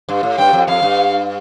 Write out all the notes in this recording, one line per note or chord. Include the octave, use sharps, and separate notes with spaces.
G2
A2
G2 G5
F2
F2 F5
G2